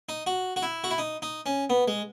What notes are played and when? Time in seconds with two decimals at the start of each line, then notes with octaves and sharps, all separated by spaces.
0.09 D#4
0.27 F#4
0.56 F#4
0.62 E4
0.84 F#4
0.91 E4
0.98 D#4
1.22 D#4
1.46 C#4
1.70 B3
1.88 G#3